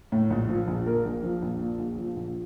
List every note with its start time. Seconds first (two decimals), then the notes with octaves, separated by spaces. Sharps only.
0.12 A2
0.30 A#1
0.49 F3
0.68 A#1
0.86 A#2 A#4
1.05 A#1
1.23 F3
1.42 A#1
1.61 A#2
1.79 A#1
1.98 F3
2.16 A#1